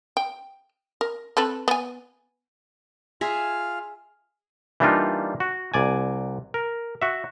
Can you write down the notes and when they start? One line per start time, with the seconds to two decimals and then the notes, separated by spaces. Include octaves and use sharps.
0.17 G5
1.01 A#4
1.37 C4 A4 B4
1.68 B3 G#5
3.21 F4 G#4 E5 F5
4.80 E3 G3 A#3 D4 D#4 F4
5.40 F#4
5.74 C2 D5 G#5
6.54 A#4
7.02 F#4 E5